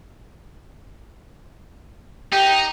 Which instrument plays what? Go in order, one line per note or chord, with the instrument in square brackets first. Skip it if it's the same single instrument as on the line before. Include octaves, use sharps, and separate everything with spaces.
[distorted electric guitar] D#4 [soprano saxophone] G4